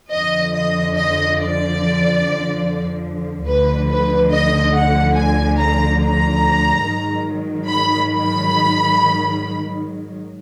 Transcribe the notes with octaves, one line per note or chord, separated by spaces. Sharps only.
F2 D3 F3 D#5
D#5
D#5
D5
D2 D3 F3 B4
B4
D#5
F#5
G#5
A#5
A#5
G#2 D#3 F#3
B5
B5